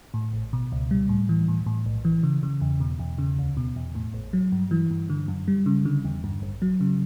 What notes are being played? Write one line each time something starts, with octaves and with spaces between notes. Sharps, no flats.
A2
A1
B2
C#2
G3
A2
E3
A2
A2
B1
E3
C#3
C#3
E2
B2
E2
C#3
D2
B2
E2
A2
A1
F#3
G2
E3
G2
D3
F#2
G3
C#3
D3
E2
G2
A1
F#3
C#3